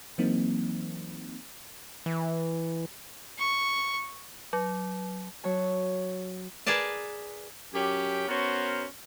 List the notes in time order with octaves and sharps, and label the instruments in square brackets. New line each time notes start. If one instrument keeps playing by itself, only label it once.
[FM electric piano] E3 F#3 A#3 C4 D#4
[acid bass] E3
[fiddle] C#6
[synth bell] F#3
[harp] F#3 C#5 A5
[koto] G#4 A#4 B4 D5 A5
[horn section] F#2 C#4 G4
B3 C#4 F#4 A#4 C5